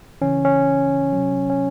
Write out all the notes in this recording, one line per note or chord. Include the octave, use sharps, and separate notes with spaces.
C#3 E3 C#4
C#4
C3 F#3
C#4